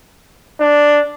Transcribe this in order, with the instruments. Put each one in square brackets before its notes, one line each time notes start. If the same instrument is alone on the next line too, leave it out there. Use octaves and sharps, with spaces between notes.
[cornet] D4